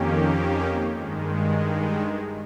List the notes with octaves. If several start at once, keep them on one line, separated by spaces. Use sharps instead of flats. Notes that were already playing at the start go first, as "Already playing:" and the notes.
Already playing: F2 D#3 A#3 C#4 G4
G2 D#3 G#3